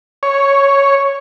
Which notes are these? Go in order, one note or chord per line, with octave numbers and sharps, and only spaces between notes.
C#5